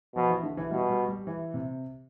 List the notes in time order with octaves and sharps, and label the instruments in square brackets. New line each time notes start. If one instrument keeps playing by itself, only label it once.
[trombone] B2 [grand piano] F3
[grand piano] E3
D3
E3
[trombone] B2 [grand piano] G3
[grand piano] G3
G3
E3
C3